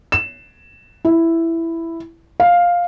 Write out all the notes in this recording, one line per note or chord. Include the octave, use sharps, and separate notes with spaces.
E7
E4
F5